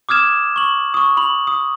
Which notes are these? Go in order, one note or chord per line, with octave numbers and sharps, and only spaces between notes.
D6 D#6 F6 G#6 E7
C#6 F#7
C#6 D#6
B5 F#7
D#6